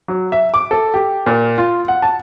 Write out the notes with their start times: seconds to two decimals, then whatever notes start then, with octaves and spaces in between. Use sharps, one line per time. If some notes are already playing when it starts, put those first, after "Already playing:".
0.08 F#3
0.32 E5
0.54 D6
0.71 A4
0.94 G4
1.26 A#2
1.58 F4
1.88 F#5
2.02 A5